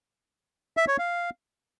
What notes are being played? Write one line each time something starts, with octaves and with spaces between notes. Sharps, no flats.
E5
C#5
F5